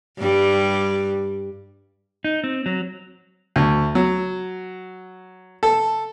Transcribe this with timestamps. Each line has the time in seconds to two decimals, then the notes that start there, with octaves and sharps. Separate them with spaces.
0.18 G2 G3
2.24 D#4
2.44 C4
2.66 F#3
3.56 D2
3.95 F#3
5.63 A4